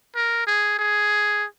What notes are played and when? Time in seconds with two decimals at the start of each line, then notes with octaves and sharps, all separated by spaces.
0.16 A#4
0.47 G#4
0.79 G#4